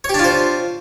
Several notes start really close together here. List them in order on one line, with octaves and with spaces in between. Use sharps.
C#5 G4 D4 F4 C5